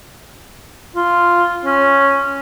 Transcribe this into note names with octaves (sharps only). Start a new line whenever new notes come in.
F4
C#4